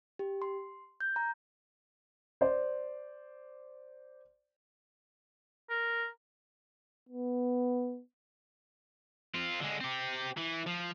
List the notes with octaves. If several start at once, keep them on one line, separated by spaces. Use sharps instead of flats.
G4
C6
G6
A#5
C5 D5
A#4
B3
C4 F4
D3 G#3
C4 G4
E3
F3